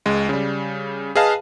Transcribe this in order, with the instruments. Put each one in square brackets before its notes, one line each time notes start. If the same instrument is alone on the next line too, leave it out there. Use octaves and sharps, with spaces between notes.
[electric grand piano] C#2 G#3
C#3 G3
G#4 B4 D#5 F5 A5